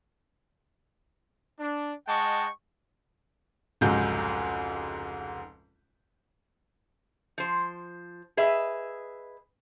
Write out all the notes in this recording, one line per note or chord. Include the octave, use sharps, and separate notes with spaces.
D4
G#3 D#5 F#5 G5 A5 C#6
F1 C#2 G#2 F#3 G#3 G6
F3 C5
G#4 B4 D#5 E5